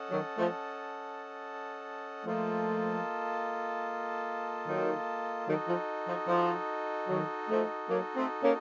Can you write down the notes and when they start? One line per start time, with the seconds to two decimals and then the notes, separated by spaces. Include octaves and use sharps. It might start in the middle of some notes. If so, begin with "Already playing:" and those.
Already playing: C#4 A4 D#5 F#5 A5
0.11 D#3 F#3
0.38 F3 A3
2.25 F3 A3 A#3 F4 A4 D#5 A5
4.67 D#3 F#3
5.48 D#3 F#3 D#4 F#4 A4 D#5
5.68 F3
6.08 F3
6.28 F3
7.09 D#3 F#3
7.49 F3 A3
7.89 F#3 A#3
8.16 A3 C4
8.43 A#3 C#4